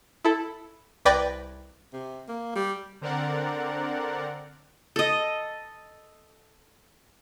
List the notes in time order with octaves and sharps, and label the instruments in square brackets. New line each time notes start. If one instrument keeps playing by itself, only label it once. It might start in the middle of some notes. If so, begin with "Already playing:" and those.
[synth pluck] E4 A4
C2 B4 D5 G5 G#6 A#6
[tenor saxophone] C3
A#3
G3
[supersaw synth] D3 C4 A#4 D5 F#5
[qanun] A4 D#5